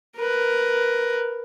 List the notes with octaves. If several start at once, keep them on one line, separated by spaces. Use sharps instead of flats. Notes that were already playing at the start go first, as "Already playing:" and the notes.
A#4 B4